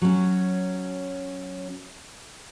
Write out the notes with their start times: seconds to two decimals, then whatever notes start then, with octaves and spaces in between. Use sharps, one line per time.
0.02 F#3 C#4